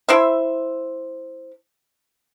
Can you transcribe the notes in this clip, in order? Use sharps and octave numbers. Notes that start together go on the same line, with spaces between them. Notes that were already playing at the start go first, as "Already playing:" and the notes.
E4 C5 E5